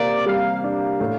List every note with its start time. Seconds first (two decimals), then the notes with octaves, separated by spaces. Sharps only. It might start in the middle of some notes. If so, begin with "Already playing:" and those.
Already playing: C3 A#3 D5
0.26 G3 F5
0.63 D4 F5
1.00 A2